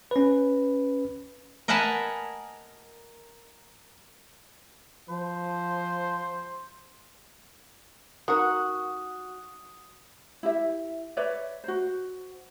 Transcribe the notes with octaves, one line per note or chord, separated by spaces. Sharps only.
C#4 B4
A#4 D#5 F#5 G#5 A5 B5
F3 C5
D#3 F#4 A#4 D#6
E4 G4 E5
B4 C#5 D5 E5
F#4 C5